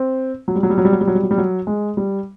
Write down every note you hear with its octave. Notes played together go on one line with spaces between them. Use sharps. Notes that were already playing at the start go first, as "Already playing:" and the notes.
Already playing: C4
F#3
G3
F#3
G3
F#3
G3
F#3
G3
F#3
G3
F#3
G3
F#3
G#3
G3